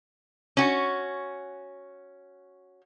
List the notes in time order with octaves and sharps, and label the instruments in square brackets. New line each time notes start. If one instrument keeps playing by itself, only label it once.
[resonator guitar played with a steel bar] C#4 F#4